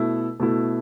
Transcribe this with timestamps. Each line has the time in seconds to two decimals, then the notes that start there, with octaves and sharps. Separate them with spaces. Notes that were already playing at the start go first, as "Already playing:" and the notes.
Already playing: B2 A3 E4
0.40 B2 A3 E4